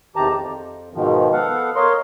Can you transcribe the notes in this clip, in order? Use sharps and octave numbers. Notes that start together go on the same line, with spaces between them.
E2 C3 D#3 G4 A5 A#5
F2
G#2 B2 D#3 F3
B3 A4 F5 F#5
A#4 C#5 D#5 F5 C6